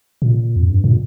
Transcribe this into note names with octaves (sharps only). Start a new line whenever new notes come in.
A#2
F2
G2
A#2